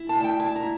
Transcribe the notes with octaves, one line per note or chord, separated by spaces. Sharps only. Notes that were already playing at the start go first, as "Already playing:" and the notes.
Already playing: E4
A5
D2
G5
E4 A5
A#5
E4